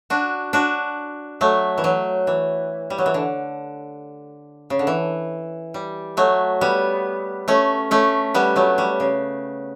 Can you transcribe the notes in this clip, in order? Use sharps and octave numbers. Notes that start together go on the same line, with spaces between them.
D4 F#4
D4 F#4
F#3 A3
E3
F#3
E3
G3
F#3
E3
D3
C#3
D3
E3
G3
F#3 A3
G3 B3
A3 C#4
A3 C#4
G3 B3
F#3 A3
G3
C#3